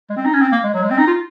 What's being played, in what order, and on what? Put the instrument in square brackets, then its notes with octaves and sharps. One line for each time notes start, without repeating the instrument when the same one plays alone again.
[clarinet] G#3
C4
D#4
C#4
C4
A#3
G#3
F#3
G#3
C4
D#4
F4